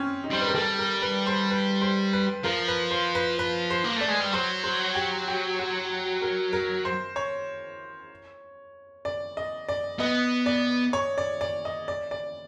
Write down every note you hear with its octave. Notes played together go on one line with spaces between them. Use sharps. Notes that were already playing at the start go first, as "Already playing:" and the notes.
Already playing: C4 C#4
D#4
G3 C5
B4
A#4
G3 A4
A#4
B4
C5
B4
C5
B4
F3 A#4
B4
C5
B4
B4
C5
A#3
A3 D5
G#3
G3
F#3 C5
C5
G4
G4
F#4
A#4
A#4
C5
C#5
D5
D#5
D5
B3 D#5
D5
C#5
D5
D5
D#5
D5
D5